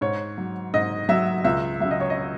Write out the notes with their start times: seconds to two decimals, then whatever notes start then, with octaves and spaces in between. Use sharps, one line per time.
0.01 G#2 C#5
0.38 F#3
0.74 G#2 D#5
1.09 F#3 E5
1.44 C#2 E5
1.80 C#3 F#3 E5
1.91 D#5
2.00 C#5
2.10 D#5